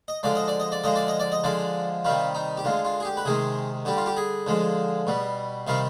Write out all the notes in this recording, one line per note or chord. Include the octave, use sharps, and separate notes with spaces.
D#5
D3 F3 G#3 D5
D#5
D5
D#5
D5
D3 F3 G#3 D#5
D5
D#5
D5
D#5
D3 F3 G#3 D5
C3 D#3 G3 F4
D#4
G4
D3 G#3 F4
F4
G#4
G4
B4
C3 D#3 G#3 G#4
D3 G3 G4
F4
G4
G#4
D3 F3 G#3
B2 G3
C3 D#3 G3 F5